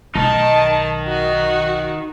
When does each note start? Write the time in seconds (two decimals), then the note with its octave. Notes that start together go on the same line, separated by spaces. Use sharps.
0.15 B1 D#3 A3 D#4 A5
1.08 F#4